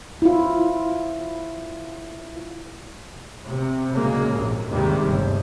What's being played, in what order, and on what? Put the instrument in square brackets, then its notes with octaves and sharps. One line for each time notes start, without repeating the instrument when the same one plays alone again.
[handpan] E4 F4
[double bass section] C3
A#2 C#3 F#3 G#3 A#3
A#1 F2 G#2 C3
D#2 G#2 C3 D#3 G3 G#3
G1 D2